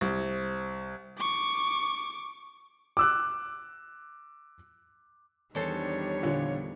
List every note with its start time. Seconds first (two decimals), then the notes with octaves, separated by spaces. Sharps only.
0.01 C2
1.18 C#6 D6
2.97 D6 E6 F#6
5.55 E2 D#3 G3 D4 A4 C5 C#5
6.23 A#2 D3 F3